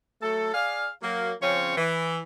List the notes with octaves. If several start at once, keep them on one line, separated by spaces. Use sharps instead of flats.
F#3 A3 A4
G#4 D5 F5
F#3 A#3
C#3 F3 C4 C#4 C#5
E3